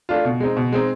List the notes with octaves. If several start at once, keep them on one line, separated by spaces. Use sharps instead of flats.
A3 D4 F4
B2
G#3 C4 D#4
B2
G#3 C4 D#4